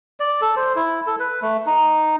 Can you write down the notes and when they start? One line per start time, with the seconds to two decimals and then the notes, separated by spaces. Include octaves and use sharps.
0.20 D5
0.41 A4
0.56 C5
0.76 E4
1.07 A4
1.20 B4
1.42 A3
1.66 D#4